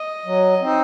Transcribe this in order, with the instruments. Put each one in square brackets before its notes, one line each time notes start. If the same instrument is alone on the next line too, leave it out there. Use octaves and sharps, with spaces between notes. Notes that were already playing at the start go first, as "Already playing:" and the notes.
Already playing: [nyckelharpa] D#5
[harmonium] F#3
C4 D#4